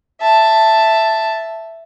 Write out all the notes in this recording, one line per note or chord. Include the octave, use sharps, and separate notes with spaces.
E5 A5